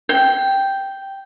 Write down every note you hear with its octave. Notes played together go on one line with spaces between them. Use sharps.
G5